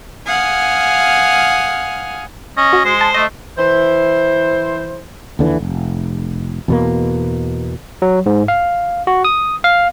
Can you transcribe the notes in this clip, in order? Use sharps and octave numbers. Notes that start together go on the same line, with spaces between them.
F5 F#5 G#5 D#6 F6
C#4 D#5
F#4
G#3 C5
A5
A3 D#5
E3 E4 C5
D#2 D3 E3
F1
E2 B2 A#3
F#3
G#2
F5
F#4
D#6
F5